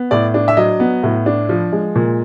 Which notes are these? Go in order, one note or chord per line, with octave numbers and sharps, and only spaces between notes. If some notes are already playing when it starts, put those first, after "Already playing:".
Already playing: B3
A2 D5
D4
E5
F#3 D#5
B3
A2
D4
F3
G#3
A#2